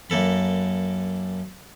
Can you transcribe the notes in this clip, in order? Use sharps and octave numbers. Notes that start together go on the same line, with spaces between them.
F#2 A#3 A4 B5